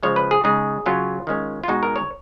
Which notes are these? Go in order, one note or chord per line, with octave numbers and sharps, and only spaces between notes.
C#3 F3 G#3 C#5
B4
G#4
C#3 G#3 D#4 G#4
C#3 F#3 C#4 F4
D#3 G#3 C#4
F4
B2 G#3 B3 D#4 F#4
A#4
C#5